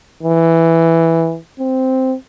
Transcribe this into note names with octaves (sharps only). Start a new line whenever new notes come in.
E3
C4